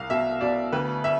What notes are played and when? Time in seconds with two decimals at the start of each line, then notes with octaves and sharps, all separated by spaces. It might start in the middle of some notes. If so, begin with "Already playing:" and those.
Already playing: C2 F5
0.10 B2 E5
0.41 B2 D5
0.73 D2 B4
1.04 E5